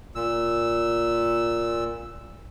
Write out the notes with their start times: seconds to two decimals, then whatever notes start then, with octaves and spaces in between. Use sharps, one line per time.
0.15 A#2 E6